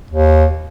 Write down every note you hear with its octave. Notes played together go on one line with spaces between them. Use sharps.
D#2